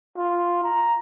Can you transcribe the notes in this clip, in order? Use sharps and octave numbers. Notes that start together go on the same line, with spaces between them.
F4
A#5